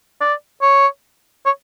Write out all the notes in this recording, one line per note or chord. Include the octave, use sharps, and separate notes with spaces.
D5
C#5
C#5